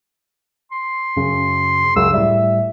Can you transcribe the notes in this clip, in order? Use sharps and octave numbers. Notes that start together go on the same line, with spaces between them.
C6
F#2 C#3
C#2 F#2 C#3 E6
A2 G3 E5